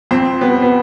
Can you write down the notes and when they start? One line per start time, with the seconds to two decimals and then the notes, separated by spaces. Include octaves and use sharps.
0.11 F2 C4
0.41 G3 B3
0.62 B3